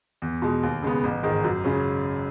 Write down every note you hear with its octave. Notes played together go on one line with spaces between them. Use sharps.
E2
B2 G#3
D#2
C#3 G#3 B3
A1
G#2 D#3 G#3
F#2
C#3 G#3 C#4